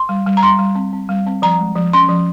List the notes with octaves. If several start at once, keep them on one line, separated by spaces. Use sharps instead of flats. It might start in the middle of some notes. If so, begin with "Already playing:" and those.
Already playing: C6
G3
G3
A#5
G3 C6
G3
C4
C4
G3
C4
F3 A#5
G#3
F3
C#4 C6
F3